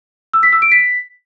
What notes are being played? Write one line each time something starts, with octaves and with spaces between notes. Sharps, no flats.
E6
B6
E6
D7
B6